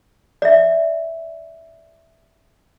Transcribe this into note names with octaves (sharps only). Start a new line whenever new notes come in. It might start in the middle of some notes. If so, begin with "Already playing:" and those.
D5 E5